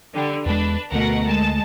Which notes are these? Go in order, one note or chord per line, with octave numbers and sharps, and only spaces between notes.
D3 G3
E2 G#3 D4 B4
D2 B2 A3 A#4 F#5
G#3 A5